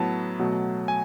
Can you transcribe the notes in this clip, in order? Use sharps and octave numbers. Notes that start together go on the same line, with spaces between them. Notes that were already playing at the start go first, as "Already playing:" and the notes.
Already playing: A2 F#3 B3 E4 A5
B2 F#3 A3
G#5